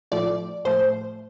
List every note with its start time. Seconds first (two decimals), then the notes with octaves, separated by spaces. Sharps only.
0.12 A2 F3 A3 D5
0.65 A2 F3 A3 C5